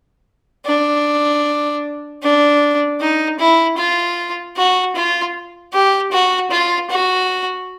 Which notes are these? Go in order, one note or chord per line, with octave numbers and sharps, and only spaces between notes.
D4
D4
D#4
E4
F4
F#4
F4
G4
F#4
F4
F#4